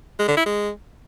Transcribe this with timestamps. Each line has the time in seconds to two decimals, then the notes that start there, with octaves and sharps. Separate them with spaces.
0.19 G#3
0.28 D3
0.37 E4
0.46 G#3